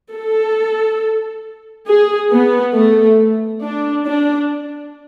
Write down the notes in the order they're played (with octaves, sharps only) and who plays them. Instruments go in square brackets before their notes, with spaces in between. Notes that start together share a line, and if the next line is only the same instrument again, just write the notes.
[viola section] A4
G#4
B3
A3
D4
D4